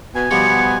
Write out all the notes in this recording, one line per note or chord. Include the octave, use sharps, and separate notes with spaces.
B2 G#5
B2 F3 G3 B3 C#7
B3